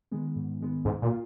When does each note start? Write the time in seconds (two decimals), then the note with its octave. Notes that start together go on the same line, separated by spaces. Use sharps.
0.11 D#3 G#3 B3
0.36 G#2
0.61 D#3 G#3 B3
0.85 C#2 G#2
1.02 A#2
1.10 F4